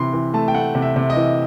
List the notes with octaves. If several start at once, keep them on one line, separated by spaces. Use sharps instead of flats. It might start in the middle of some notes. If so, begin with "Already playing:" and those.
Already playing: C3 E3 B5 C6
E3
A3 A5
G5
A3 F#5
C3
E5
C3
D#5
E3